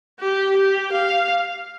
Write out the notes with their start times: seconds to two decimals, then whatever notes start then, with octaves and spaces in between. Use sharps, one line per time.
0.20 G4
0.56 G4
0.92 F5